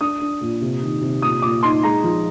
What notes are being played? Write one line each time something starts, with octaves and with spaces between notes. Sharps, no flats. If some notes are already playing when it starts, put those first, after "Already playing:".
D4 D#6
D4
A#2
C3
D#3
C3
A#2 D#6
A#2 D6
D#4 C6
G#3 A#5
F3